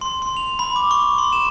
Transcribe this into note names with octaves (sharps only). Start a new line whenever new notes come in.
C6
C6
F7
B5
D6
C#6
C6
E7